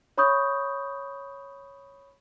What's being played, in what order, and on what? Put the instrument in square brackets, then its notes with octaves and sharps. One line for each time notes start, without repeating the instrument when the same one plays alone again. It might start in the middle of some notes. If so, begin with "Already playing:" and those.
[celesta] C#5 B5 C#6 D#6 G6